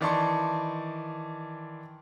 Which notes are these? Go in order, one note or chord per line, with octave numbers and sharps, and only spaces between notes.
D#3 E3 D5 A5 C6 C#6